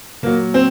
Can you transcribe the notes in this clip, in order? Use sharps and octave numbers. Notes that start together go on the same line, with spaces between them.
A#2 F#3 A#3
C4